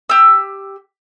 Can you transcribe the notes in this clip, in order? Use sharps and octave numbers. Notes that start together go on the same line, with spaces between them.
G4 E6